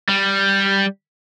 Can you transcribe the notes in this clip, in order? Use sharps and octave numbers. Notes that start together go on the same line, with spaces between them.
G3